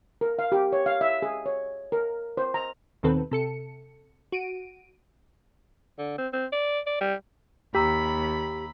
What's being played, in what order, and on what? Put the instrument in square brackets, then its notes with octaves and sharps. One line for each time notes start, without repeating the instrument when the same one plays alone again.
[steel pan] A#4
F5
G4
C#5
F5
E5
G#4
C#5
A#4
C5
A#5
[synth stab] D#2 B2 D#3 C4 A4 B4
C3 A4 C#7
F#4 D7 D#7
[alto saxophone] D3
C4
C4
D5
D5
G3
[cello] D#2 [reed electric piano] G4 [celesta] A#5 E6 B6 [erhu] B5